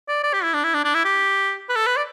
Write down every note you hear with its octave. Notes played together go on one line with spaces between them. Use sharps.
D5
D5
G4
E4
D4
E4
D4
D4
E4
G4
B4
A4
B4
D5